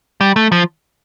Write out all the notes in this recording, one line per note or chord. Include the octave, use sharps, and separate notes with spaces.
G3
A3
F3